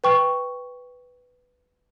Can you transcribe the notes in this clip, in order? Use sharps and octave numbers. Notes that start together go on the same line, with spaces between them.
B4 G5 C#6